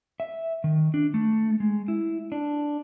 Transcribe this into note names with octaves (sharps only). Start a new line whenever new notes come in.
E5
D#3
D4
A3
G#3
E4
D4